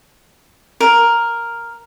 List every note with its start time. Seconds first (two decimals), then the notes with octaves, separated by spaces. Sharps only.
0.80 A#4